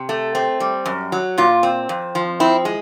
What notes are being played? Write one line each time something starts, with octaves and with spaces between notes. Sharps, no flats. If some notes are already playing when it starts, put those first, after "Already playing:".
Already playing: C3
A3
C4
G3
F#2
F#3
A#2 F4
C4
F2
F3
C4 E4
G#3